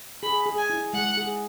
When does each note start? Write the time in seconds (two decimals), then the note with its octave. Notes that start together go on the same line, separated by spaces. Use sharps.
0.23 G#4 B5
0.46 G#4
0.58 G#5
0.70 E4
0.93 G#3 F#5
1.17 G#4